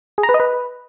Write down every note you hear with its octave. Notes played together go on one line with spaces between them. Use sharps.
G#4
A#5
B4
D#5
B4